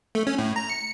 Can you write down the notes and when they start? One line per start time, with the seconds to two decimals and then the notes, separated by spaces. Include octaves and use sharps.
0.15 A3
0.27 C#4
0.38 A2
0.56 A#5
0.70 C#7